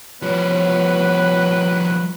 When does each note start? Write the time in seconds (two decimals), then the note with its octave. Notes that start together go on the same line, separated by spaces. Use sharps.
0.22 E2 F3 G3 B3 B4 C#5